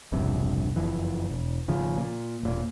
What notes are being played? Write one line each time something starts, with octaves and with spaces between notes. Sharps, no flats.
E1 A#1 G2 C3
F#1 F2 E3
E1
G#1 C#3 F3
A#2
E1 A#2